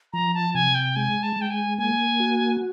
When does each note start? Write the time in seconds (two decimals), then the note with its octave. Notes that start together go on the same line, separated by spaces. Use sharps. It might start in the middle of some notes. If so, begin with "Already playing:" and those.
0.13 F3 A#5
0.34 A5
0.54 C3 G#5
0.75 G5
0.96 G#3 G#5
1.23 A5
1.36 G#3 G5
1.50 G#5
1.78 A#3 G#5
2.20 F#4